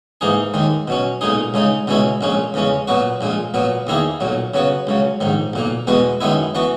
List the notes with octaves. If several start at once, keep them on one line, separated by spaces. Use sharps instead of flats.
G#2 E3 A#3 D#4 G#4
D#2 D#3 G#3
B2 F#3 C#4
B1 A#2 G#3 D#4 G#4
C#2 C#3 G#3 D#4
C#2 B2 G#3 C#4 E4
A#1 A#2 G#3 C#4
E2 C#3 G#3 C#4
A#2 F#3 B3 F#4
A#1 A#2 G#3
A#2 F#3 B3
E2 D#3 A#3 E4 G#4
B1 A#2 F#3
C#3 F#3 B3 F#4
C#2 C#3 F#3
A#1 G#2 D#3
B1 A#2 A#3
E2 B2 G#3 B3 F#4
F#2 D#3 G#3 B3 E4
E3 B3 F#4